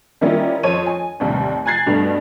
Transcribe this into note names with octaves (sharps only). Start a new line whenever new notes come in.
D#3 G3 A#3 C#4 E4 F4
F2 C5 C#5 A5 D#7
G#5
A1 D#2 C3 G3
G#5 A#5 F#6 G#6 A6 C7
G2 B2 G3 A3